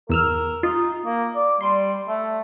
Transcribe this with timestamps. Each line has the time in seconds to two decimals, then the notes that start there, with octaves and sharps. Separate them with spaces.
0.09 E2 A#4 E6 F6
0.63 D#4 F4
1.05 A#3
1.35 D5
1.61 G3 C6
2.08 A3